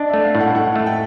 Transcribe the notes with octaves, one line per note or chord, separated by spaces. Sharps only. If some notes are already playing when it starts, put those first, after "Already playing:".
Already playing: D4 D#5
A3 E5
F5
A2
F#5
A2 F#5
A3
G5